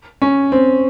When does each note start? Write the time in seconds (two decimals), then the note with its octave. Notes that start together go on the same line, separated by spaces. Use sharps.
0.22 C#4
0.52 C4